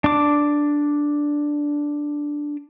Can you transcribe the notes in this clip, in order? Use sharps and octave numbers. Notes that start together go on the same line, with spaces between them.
D4 D6